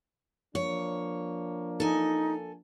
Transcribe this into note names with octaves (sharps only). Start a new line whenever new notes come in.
F3 A#3 D4 C#5
D#4 A4 G#5